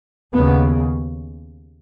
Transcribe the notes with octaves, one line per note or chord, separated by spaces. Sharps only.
D#2 C#3 B3